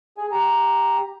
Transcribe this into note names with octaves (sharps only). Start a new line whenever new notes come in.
G#4 G#5
G4 A#5